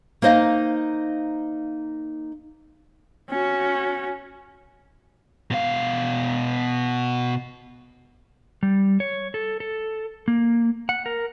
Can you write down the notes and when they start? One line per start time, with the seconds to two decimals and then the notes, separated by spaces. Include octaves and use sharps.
0.22 A#3 D#4 C5 D#5 F5
3.30 C#4 F#4
5.51 B2 F5
8.63 G3
9.00 C#5
9.34 A4
9.60 A4
10.28 A#3
10.89 F#5
11.06 A#4